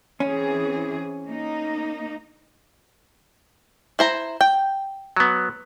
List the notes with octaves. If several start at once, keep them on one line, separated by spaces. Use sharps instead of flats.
E3 C4 C#4 G#4
A#3 D#4
E4 C5 A#5
G5
F#3 B3